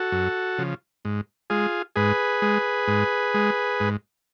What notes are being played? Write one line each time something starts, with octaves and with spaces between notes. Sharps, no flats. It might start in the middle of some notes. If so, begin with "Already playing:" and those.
Already playing: F#4 A4
F#2
C#3 F3
G#2
G#3 F4 G#4
G#2 G#4 B4
G#3
G#2
G#3
G#2